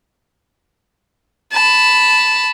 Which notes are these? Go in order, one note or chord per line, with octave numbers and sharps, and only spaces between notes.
A5 B5